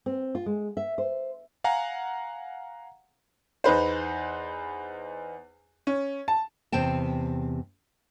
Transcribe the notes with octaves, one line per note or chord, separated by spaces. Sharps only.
C4
F4
G#3
E5
C5
F5 F#5 G#5 A#5
E2 D#4 B4 C5
C#4
A5
E2 C3 C5 G5 A5